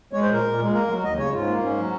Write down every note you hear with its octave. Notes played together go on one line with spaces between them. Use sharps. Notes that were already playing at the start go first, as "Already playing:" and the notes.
G#3 C#5
C5
A#2 A#4
A#2
G#3
A#3 A#4
F#3
D#2 D#5
C#3 C#5
G#2 F4
A#3
G#2 C#4
F#3